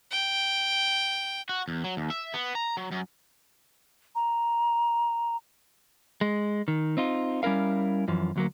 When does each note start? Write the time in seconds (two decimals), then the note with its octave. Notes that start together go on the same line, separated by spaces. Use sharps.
0.11 G5
1.49 F#4
1.68 E2
1.84 F#3
1.97 D#2
2.10 E5
2.34 B3
2.55 A#5
2.77 F#3
2.91 F#2
4.15 A#5
6.21 G#3
6.68 D#3
6.97 C4 D#4 F4
7.43 G3 C#4 E4 A#4 F5
8.08 F#2 E3 F3
8.36 D2 F#3 A#3